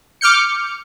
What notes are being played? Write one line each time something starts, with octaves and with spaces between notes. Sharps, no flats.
D6 F6 G6 C#7